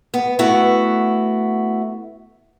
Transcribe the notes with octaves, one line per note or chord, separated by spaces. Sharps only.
B3
A3 B3 E4 F#4